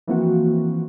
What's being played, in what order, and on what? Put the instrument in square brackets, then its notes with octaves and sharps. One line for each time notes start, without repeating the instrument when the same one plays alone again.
[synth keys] E3 F3 A#3 C4 F#4